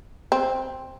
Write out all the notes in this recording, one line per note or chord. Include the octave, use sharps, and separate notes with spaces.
C4